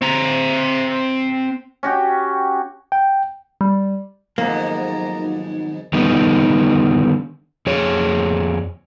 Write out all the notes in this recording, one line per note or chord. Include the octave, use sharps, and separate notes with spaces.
C4 A#5
C#4 F#4 G4
G5
G3
F2 G#2 D#3 F#3 A#3 B3 D#4 A#5
D3 D#3 G3 B3 D#4
F2 G#4 C#5